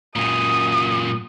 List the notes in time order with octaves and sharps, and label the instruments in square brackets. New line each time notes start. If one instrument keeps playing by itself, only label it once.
[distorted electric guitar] F#2 A#2 [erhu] D#6